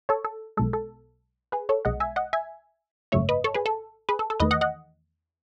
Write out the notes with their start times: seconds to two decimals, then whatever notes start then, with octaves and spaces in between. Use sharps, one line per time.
0.09 A4 C#5
0.25 A4
0.57 B1 B2 G#3 A4
0.73 A4
1.52 G#4 B4
1.69 A4 C#5
1.85 B1 B2 G#3 D#5 F#5
2.00 E5 G#5
2.16 D#5 F#5
2.33 E5 G#5
3.12 G#1 F#2 C#3 F#3 A3 C#5 E5
3.29 B4 D#5
3.44 A4 C#5
3.54 G#4 B4
3.66 A4
4.09 G#4 B4
4.19 A4
4.30 A4
4.40 E2 D#3 A3 B4 D#5
4.51 D#5 F#5
4.61 D#5 F#5